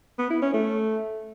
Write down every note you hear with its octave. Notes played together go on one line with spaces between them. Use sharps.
B3
E4
C#4
A3